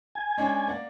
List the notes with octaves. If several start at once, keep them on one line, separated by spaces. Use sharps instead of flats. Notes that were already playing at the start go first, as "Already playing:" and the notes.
G#5
G#3 C#4 D4
A#3 D5 F#5